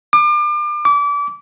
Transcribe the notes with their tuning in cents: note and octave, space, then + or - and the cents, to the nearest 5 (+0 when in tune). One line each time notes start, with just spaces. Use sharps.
D6 +35
D6 -30